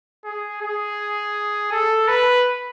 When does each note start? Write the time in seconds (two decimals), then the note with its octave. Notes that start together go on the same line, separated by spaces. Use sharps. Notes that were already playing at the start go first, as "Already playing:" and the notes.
0.25 G#4
0.61 G#4
1.72 A4
2.08 B4